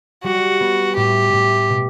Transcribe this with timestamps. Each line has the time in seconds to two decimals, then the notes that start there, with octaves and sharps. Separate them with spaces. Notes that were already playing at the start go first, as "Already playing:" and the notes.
0.24 G3 F#4
0.60 B3
0.96 A2 G4
1.33 A2
1.70 B2